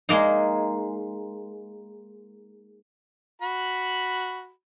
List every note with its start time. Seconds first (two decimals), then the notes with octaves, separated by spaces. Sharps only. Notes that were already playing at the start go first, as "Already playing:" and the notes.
0.09 G#3 A#3 D#4
3.42 F#4 B5